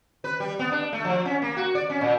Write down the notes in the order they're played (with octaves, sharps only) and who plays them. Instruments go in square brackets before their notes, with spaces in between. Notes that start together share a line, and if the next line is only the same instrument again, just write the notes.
[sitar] B4
G3
B3
D4
A3
F3
C#4
A#3
F#4
D5
C#4
A#2